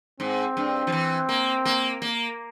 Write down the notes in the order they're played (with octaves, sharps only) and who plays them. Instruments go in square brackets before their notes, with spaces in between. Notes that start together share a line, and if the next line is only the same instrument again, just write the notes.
[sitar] G#2 [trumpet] C4
[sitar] G2
F3
E3
A#3
A#3
A#3